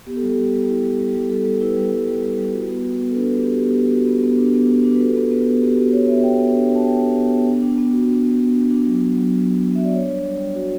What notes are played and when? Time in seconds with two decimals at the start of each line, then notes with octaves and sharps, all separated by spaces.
0.06 B3 G4
0.16 A4
0.22 G3 G4
0.38 G3
0.53 G3
0.69 E4
0.84 G3
0.99 G3
1.15 G3
1.30 G3 A4
1.45 G3
1.61 E4 B4
1.77 G3
1.91 G3
2.08 G3
2.23 G3
2.38 G3
2.53 F#4
2.69 B3
2.84 F#4
3.00 B3
3.11 A4
3.15 D4 B4
3.31 D4 G4 A4
3.46 D4
3.56 B3 G4
3.77 B3
3.92 F#4
4.07 B3
4.23 B3
4.39 D4
4.54 B3
4.70 D4
4.85 D4
4.95 B4
5.00 F#4 A4
5.16 B3
5.31 B3 B4
5.47 B3
5.62 B3 G4
5.77 B3 F#4
5.92 B3 C#5
6.08 B3 E5
6.23 B3 G5
6.39 B3
6.54 D4
6.69 D4
6.76 A5
6.85 B3 G5
7.00 D4
7.16 B3
7.32 B3
7.47 D4
7.62 D4
7.78 B3
7.93 F#4
8.08 D4
8.24 B3
8.39 B3
8.55 D4
8.70 D4
8.86 F#3
9.01 D4
9.16 F#3
9.32 F#3
9.47 D4
9.63 D4
9.75 F#4 E5
9.85 D5
9.94 D4 C#5
10.09 G3
10.24 G3
10.40 G3
10.55 F#4